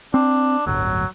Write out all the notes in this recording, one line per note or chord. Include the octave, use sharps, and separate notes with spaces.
C4 D4
D1 G1 F#3